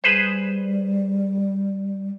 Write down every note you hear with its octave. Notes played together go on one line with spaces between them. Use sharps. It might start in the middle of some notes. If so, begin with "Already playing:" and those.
G3 G#4 B4 C5